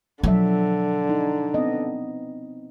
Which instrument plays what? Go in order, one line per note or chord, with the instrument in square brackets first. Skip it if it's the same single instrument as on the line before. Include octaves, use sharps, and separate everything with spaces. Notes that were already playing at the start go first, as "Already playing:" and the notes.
[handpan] B2 F3 E5 [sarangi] D3 [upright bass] F#3
[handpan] D#4
B3 C4 D#5